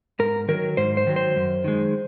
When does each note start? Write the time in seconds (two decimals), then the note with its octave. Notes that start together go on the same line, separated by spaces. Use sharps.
0.19 G#2 A#4
0.48 D#3 F#3 A#4
0.77 G#2 C5
0.97 C5
1.07 D#3 F#3
1.16 C5
1.36 F#2
1.64 D#3 G#3